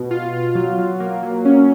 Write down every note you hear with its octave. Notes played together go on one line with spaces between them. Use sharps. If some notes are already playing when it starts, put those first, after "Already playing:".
Already playing: B2
F4
F4
F#3
F#3
A#3
F#3
C#4